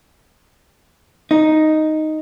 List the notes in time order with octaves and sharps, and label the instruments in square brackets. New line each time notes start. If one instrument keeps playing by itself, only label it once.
[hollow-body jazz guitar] D#4